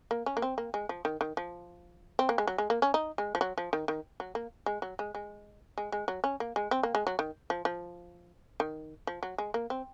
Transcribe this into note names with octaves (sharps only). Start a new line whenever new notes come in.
A#3
C#4
A#3
C4
A#3
G#3
F3
D#3
D#3
F3
C4
A#3
G#3
F#3
G#3
A#3
C#4
D#4
G#3
F3
F#3
F3
D#3
D#3
F#3
A#3
G#3
F#3
G#3
G#3
G#3
G#3
F#3
C#4
A#3
G#3
C4
A#3
G#3
F#3
D#3
F3
F3
D#3
F3
F#3
G#3
A#3
C4